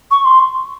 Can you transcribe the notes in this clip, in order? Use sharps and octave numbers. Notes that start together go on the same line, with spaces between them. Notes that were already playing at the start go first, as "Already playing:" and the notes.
C#6
C6